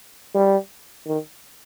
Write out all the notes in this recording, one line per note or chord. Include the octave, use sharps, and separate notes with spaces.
G3
D#3